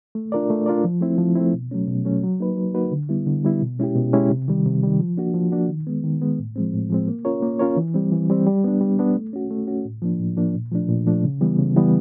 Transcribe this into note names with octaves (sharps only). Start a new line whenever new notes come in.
A3
D4 F4 A#4 D5
A3
D4 F4 A#4 D5
F3
A3 C4 E4
F3
A3 C4 E4
B2
F#3 A3 C#4
B2
F#3 A3 C#4
F#3
A#3 D#4 F#4 B4
F#3
A#3 D#4 F#4 B4
D3
G3 B3 E4
D3
G3 B3 E4
B2
G#3 C#4 E4 G4
B2
G#3 C#4 E4 G4
C3
D#3 G3
C3
D#3 G3
F3
A#3 D4 F#4
F3
A#3 D4 F#4
D#3
G#3 B3
D#3
G#3 B3
A2
F3 G#3 C4
A2
F3 G#3 C4
A#3
C#4 F4 A#4 C#5
A#3
C#4 F4 A#4 C#5
E3
G3 C4
E3
G3 C4
G3
B3 D4
G3
B3 D4
A3
C#4 F#4
A3
C#4 F#4
A2
F3 A#3 D4
A2
F3 A#3 D4
A#2
F3 A3 D4
A#2
F3 A3 D4
C#3
E3 G3 B3
C#3
E3 G3 B3